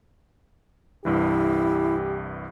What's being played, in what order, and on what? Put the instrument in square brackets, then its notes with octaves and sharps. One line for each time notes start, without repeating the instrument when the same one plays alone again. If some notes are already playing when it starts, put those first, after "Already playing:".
[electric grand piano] C2 G2 E3 [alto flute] E4 [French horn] G4